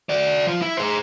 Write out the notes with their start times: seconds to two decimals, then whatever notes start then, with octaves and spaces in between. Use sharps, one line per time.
0.09 F#4 D5
0.47 F3 F4
0.62 E4
0.77 G#4 C5